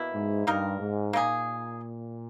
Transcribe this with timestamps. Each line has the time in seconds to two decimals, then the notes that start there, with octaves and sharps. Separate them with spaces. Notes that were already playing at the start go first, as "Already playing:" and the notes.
Already playing: B2 A#3 E4
0.14 G#2
0.47 G2 A#3 D#4 A#4
0.80 G#2
1.13 A#2 A#3 D#4 G#4